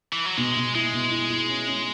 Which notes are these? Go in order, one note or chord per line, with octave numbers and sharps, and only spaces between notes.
E3
F#3
B2 G#3
B2
G#3 E4
B2
E4
E4
C#4
C#4